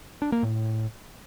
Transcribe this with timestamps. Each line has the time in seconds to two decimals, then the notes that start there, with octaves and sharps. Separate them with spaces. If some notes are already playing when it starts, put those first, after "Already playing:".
0.22 D4
0.32 A#3
0.43 A2